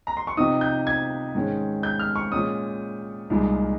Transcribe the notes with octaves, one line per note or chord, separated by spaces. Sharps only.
A#5
C6
C#6
C3 F3 C4 D#4 D#6
G6
G#6
G#2 D#3 G#3 C#4
G6
F6
C#6
A#2 G#3 C#4 D#6
C2 A#2 G#3 D#4